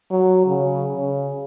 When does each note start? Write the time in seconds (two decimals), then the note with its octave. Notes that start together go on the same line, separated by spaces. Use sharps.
0.11 F#3
0.47 C#3
0.95 C#3